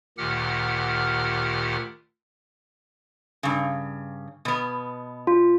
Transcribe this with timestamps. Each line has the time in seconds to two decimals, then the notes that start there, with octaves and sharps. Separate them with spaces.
0.18 D2 A#2 D#3 G4 F#5 F6
3.43 G2 C#3
4.45 B2 B3
5.27 F4